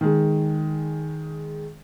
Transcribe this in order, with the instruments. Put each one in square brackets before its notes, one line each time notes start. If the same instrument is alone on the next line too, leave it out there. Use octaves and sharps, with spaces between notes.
[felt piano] D#3 G#3